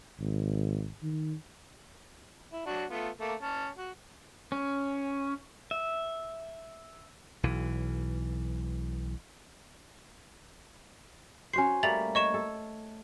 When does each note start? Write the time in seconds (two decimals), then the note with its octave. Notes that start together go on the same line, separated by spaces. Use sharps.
0.19 G#1
1.02 D#3
2.52 E4
2.66 F#3 D4 F#4
2.90 A3 B3 F4
3.20 A3 A#3
3.42 C#4 A5
3.77 F#4
4.52 C#4
5.71 E5
7.43 B1 E3
11.53 C#4 F#4 C5 C7
11.83 G3 A3 A#3 A6 F7 F#7
12.15 C#5 D#5 C#6 E7
12.34 A4